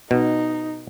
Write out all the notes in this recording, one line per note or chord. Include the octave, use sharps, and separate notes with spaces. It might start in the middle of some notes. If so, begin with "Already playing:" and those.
B2 D#4